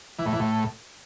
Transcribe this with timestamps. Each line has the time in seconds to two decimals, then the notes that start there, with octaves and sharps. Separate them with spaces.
0.19 E3
0.26 A2
0.33 E3
0.40 A2